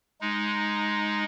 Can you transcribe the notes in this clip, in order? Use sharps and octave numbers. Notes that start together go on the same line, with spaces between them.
G#3 D#4